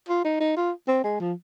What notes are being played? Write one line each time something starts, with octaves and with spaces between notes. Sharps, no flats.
F4
D#4
D#4
F4
C4
G#3
F3